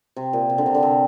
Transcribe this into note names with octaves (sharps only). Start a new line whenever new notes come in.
C3
A#2
C3
D3
C3
D3
C3